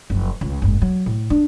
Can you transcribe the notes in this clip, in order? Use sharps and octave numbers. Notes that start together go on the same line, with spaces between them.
F#1 F3
C#2
F#1 G#2
F#3
A2
D4